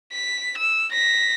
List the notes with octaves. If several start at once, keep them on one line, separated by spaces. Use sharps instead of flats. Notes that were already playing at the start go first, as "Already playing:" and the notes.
B6
E6
A#6 B6